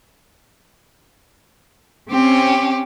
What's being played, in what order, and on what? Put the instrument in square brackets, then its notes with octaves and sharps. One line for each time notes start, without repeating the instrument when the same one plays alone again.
[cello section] C4 [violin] C#4 G4